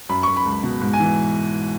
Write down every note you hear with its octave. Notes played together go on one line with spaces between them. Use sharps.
F#2 B5
F#2 C#6
B5
C#2
B2
G#2
G#5
E3